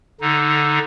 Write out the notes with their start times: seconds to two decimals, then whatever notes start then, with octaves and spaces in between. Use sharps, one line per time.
0.21 D3 D#4